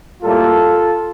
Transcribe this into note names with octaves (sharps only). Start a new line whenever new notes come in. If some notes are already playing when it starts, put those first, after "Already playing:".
A2 G3 A#3 F4 A4